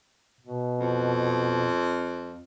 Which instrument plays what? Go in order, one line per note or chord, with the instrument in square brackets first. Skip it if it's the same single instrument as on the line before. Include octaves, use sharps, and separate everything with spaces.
[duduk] B2
[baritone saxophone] F2